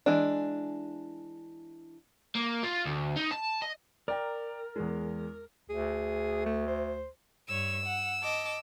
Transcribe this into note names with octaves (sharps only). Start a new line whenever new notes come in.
E3 G#3 D4
A#3
F4
D2
D#4
A5
D#5
A#4 D5 G5 A#5
E2 G#3
D2 G#4
A3
C5
G2 C#5 E6
F#5
D#5 A5 D6